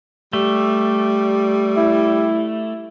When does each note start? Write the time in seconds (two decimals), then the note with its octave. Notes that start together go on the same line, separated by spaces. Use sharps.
0.33 G3 A3
1.77 E4